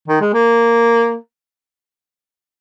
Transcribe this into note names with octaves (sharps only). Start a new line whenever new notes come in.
D#3
G#3
A#3